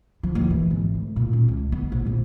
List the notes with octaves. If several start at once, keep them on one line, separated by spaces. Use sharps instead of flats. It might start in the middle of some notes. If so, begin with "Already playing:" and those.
F3
D#2
E3
G#1
D2
A#2
C#4
C#2
B3
A#1
F2